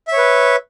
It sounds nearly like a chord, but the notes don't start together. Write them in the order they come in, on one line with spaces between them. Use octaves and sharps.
E5 C#5 B4